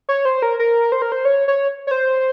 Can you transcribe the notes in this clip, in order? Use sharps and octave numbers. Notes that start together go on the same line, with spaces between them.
C#5
C5
A#4
A#4
C5
A#4
C5
C#5
C#5
C#5
C5